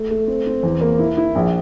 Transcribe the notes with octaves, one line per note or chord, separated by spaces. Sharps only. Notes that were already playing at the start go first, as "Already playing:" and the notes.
Already playing: A3
A3
C4
C4
E2
A#3
E4
E4
A#1